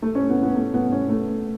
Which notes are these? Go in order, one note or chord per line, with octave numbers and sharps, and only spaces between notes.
A3
C#4
B3
B3
A3
B3
C#4
A3